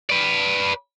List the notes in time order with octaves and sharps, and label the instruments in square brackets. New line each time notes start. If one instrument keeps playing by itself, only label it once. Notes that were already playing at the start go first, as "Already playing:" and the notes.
[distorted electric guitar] B4 D5